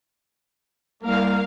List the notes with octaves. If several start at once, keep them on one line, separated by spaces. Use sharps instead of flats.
C2 A#3 A#4 F5